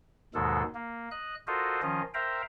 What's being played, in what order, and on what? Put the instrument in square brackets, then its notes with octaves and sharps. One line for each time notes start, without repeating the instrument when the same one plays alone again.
[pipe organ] D#2 G#2 B2 D#3 G#3 A4
A#3
D#5 F#6
F4 F#4 A4 A#4 C5 D#5
D#3 F3 C#4 F4 D#5
A#4 C5 E5 F5 G5 A#5